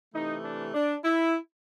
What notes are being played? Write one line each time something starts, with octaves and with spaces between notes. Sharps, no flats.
C3 E3 A3 D#4
D4
D4
E4